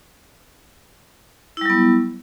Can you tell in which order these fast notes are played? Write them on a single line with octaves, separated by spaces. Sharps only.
E4 G3 F#3 B3